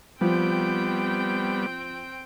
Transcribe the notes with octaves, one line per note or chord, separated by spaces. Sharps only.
F3 G3 B3 C4 G5